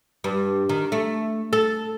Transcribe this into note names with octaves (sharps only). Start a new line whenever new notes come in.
G2
D#3
A3
A4